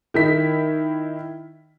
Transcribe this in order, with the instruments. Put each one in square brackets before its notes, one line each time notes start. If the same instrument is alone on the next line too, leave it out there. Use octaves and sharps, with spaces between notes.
[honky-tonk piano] D#3 E4 B6